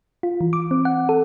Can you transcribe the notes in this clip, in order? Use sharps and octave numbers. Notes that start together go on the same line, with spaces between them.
F4
E3
D6
C4
F#5
A4